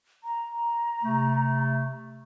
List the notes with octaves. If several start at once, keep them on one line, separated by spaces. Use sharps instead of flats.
A#5
C3 A3